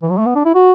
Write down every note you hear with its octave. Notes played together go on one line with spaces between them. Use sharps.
E3
F#3
A3
B3
D4
E4
F#4